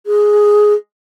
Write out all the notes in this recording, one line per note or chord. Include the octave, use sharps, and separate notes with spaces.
G#4